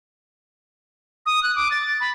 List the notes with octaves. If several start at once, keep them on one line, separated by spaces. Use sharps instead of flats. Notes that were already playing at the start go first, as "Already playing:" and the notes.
D#6
F#6
D6
A6
B5